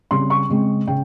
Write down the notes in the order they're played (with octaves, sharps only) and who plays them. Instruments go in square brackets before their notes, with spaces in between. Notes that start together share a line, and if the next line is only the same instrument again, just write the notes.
[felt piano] C#3 G3 C4 C6
C#6
C#3 G#3 C4
C#3 G5